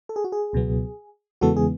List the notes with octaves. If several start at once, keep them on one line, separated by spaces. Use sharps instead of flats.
A4
G#4
F#4
G#4
C#2 B2 F#3 B3
E2 C#3 E3 G#3 B3 F#4 A4
G#4